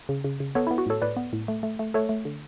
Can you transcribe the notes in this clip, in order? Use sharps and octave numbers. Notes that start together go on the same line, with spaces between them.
C#3
C#3
C#3
B3 A4 C#5
E4
B3
F#4
A2 A4 C#5
A2 B4 D5
B3
A2
A3
A3
A3
A3 A4 C#5
A3
D3